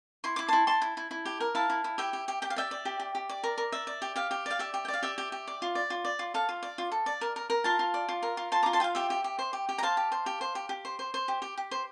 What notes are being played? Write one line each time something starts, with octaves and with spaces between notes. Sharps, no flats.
E4 C6
E4 D6
E4 A5 C6
E4 A5 C6
E4
E4
E4
G4
A#4
E4 F5 A5
E4
E4
G4 E5 G5
G4
G4
G4 G5
F5
D5 E5 G5
D5
G4
G4
G4
D5
A#4
A#4
D5 E5
D5
G4
G4 F5
G4
D5 F5
G4 E5
G4
G5
D5
F5
G4 E5
G4
G4
D5
F4
D5
F4
D5
F4
A4 F5
F4
D5
F4
A4
D5
A#4
A#4
A#4
F4 F5 A5
F4
D5
F4
A#4
F4
F4 A5 C6
F4 A#5 D6
A5 C6
F4 F5 G5
G4 E5 G5
G4
G4
C5
G4
G4
A#5
C5 F5 A5
G4
C5
G4
C5
G4
G4
C5
C5
C5
G4
G4
G4
C5